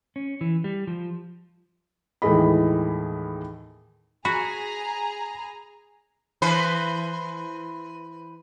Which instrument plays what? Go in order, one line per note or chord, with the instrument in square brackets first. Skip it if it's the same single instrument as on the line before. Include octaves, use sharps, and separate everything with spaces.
[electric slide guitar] C#4
E3
G3
F3
[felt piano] D#2 A2 E3 G#3 D#5 B5
[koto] F#4 [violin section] G#4 A#5 [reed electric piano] B5
[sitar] E3 B4 C5